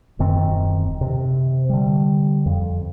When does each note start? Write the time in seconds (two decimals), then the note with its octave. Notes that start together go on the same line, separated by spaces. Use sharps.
0.19 D#1 F#2 D#3 C4
1.01 C3
1.69 D3 G3
2.46 F2